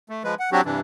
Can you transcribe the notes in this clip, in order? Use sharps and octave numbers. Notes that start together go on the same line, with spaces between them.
A3
F3 G#3 B4
F#5
F#3 C4 D4 F#4 G4
G2 C3 E3 D4